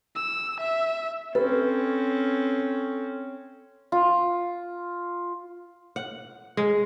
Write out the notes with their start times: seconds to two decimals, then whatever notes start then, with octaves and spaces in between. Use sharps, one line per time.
0.15 E6
0.60 E5
1.35 C4 C#4 A4 B4
3.92 F4
5.96 F#5
6.57 G#3